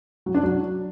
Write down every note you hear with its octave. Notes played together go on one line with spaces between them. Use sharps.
F#3
D4
F#3